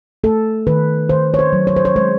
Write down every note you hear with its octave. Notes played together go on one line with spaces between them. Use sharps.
A3 A4
D#3 B4
D#3 C5
C#5
C5
F#3
C#5
C5
C#5
G#3 C5